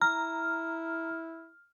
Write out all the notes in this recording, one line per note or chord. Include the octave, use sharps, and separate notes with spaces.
E4 A#5 F6